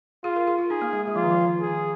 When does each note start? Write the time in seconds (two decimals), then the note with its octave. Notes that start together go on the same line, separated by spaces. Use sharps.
0.24 F4 G#4
0.36 A#4
0.47 G#4
0.58 F4
0.70 D#4 G#4
0.82 A#3
0.93 G#3
1.07 G#3
1.15 F3 F4
1.24 D#3
1.30 F3
1.46 D#3
1.61 G#4
1.66 D#3